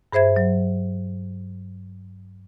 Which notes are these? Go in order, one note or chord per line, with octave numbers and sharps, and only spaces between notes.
G2 G#4 C5 E5 G#6
F#3